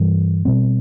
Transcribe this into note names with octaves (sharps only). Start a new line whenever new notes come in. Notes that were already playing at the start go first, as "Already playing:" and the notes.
Already playing: G2 E3 G3
B2 G3 C4